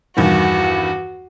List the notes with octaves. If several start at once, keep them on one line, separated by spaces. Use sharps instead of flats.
E2 G2 D#3 F#4